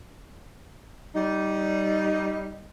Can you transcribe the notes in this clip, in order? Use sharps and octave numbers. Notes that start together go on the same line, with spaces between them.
G3 D#4